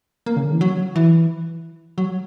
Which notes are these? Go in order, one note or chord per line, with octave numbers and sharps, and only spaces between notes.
A#3
C#3
D3
E3
F#3
E3
F#3